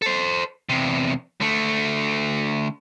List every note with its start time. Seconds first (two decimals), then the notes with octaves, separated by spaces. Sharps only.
0.02 A4 C5
0.69 E2 C3
1.41 D3 A3